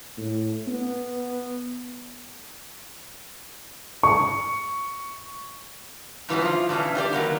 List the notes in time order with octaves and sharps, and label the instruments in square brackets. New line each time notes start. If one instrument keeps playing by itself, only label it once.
[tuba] A2
B3
[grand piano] C#6
[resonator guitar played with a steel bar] G2 A#2 E3 F#3 B3 C#4
F3 F4
G2 B2 E3 C#4
D4 G4 C5 D5
D#3 F#3 A#3 B3